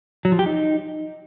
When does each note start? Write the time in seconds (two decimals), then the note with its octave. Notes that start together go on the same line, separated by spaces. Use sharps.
0.25 F#3
0.32 F3
0.39 G4
0.46 D#4